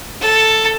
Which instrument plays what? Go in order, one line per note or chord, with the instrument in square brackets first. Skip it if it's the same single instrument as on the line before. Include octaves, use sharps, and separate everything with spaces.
[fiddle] A4